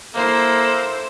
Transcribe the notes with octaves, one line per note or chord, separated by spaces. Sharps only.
A#3 E4 A4 C5